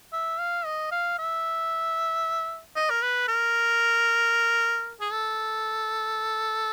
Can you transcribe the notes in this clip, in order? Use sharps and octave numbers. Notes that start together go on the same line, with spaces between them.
E5
F5
D#5
F5
E5
D#5
A#4
B4
A#4
G#4
A4